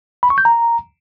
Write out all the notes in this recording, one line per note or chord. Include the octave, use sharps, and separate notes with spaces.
B5
C#6
G6
A#5